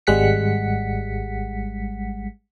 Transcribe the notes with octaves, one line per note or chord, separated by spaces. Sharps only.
G#1 G3 G#3 F#5 B6 C#7